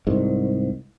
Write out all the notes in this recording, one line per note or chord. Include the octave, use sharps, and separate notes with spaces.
C2 G#2